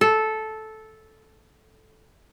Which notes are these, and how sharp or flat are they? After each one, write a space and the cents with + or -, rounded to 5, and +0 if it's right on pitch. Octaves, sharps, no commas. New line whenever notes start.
A4 -10